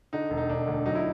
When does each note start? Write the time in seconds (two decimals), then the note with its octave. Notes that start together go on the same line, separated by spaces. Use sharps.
0.13 D3 D#4
0.30 E1
0.37 D#4
0.49 E1 D4
0.67 D2
0.86 F#3 D#4
0.95 E4